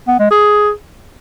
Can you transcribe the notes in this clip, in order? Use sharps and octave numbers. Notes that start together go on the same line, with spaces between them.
B3
G#3
G#4